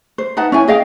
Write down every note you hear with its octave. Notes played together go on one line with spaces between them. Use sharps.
C5
D#4 B4 F#5 A5
C#4 E4 G#5
G#4 D#5 F5 G5